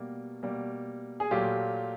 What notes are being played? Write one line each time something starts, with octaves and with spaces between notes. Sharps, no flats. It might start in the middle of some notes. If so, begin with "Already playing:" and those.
Already playing: B2 G3 A#3
B2 G3 A#3
G#4
A#2 F#3 A3 F4 G4